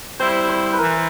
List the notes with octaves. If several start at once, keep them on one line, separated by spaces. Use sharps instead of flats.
G3 C4 E4 C5
C5
B4
E3 A#4